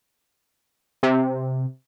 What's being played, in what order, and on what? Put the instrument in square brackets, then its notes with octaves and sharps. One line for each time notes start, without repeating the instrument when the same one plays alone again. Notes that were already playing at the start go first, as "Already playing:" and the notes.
[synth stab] C3